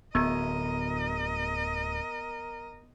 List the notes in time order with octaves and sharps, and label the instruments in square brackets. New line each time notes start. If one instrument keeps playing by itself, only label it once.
[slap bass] D1 [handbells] B3 G#6 [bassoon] A#4 [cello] D#5